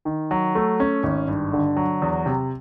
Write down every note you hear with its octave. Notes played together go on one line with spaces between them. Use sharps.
D#3
F#3
A3
C#4
G#1
G2
D3
F#3
E2
C3